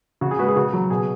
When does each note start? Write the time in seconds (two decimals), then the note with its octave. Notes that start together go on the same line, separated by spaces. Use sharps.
0.21 C#3 F#4
0.31 G#4
0.39 G#3 F#4 B4
0.48 G#4
0.56 C#3 F#4
0.73 F#3
0.90 B2 G#4